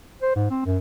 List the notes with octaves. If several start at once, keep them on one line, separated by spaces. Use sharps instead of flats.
C5
G#2
C4
F#2